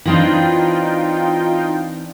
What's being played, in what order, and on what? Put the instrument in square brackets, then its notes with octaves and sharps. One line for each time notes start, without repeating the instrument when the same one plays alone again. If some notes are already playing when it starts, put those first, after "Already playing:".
[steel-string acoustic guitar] E3 C4 D4 [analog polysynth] D#4 F4 G5